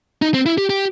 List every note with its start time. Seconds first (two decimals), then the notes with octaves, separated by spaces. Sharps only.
0.22 D#4
0.34 C4
0.46 E4
0.58 G4
0.70 G4